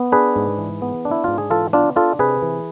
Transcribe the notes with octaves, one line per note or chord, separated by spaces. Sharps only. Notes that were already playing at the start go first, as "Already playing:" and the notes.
Already playing: B3
D4 G#4 B4
G#2
E3
B3
D4
E4
G#2 F4
G#4
E3 F4 A4
B3 D4 F4
D4 F4 A4
C3 G#4 B4
E3